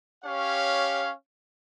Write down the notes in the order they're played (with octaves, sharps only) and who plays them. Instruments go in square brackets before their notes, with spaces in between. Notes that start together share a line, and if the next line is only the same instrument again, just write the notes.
[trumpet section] C#4 G4 C#5 F5